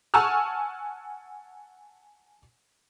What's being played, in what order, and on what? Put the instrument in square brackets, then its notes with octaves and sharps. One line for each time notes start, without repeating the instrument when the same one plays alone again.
[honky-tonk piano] F#5 G#5 A5 C#6 E6 F6